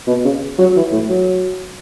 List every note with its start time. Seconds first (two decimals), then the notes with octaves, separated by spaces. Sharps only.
0.07 B2
0.25 C#3
0.59 F#3
0.76 E3
0.92 A2
1.10 F#3